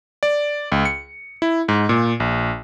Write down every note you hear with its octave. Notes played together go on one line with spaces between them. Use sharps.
D5
C#2
C#7
E4
G#2
A#2
A#1